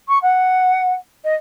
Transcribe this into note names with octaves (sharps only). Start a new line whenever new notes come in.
C#6
F#5
D#5